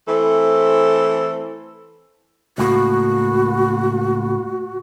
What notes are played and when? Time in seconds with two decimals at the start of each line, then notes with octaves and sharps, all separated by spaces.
0.08 E3 A3 C4 A4
2.58 C#2 A2 A#3 F#4